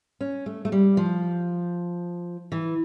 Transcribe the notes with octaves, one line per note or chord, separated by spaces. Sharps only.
C#4
A3
A3
G3
F3
E3